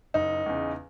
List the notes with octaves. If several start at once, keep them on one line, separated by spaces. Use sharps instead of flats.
F#1 D#4
E2 C#3